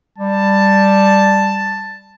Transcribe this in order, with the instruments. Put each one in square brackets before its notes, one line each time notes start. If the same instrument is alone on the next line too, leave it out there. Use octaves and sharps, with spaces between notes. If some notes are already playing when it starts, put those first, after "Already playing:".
[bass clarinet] G3 [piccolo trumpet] A5